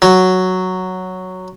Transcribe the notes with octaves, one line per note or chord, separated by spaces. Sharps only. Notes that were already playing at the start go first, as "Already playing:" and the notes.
F#3